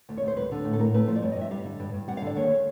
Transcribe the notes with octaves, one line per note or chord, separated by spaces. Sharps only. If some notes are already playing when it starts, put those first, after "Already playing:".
D2
C#5
D2 C5
G3 B4
D3
A2
A4
A2 A#4
A3 B4
F3 C5
D5
G2 C#5
D#5
G2 E5
G3 F5
D3
G2
G2
G3 F#5
F5
D3 D5
D#2 C#5